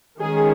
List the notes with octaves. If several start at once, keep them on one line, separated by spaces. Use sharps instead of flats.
D#3 G#3 C#4 G#4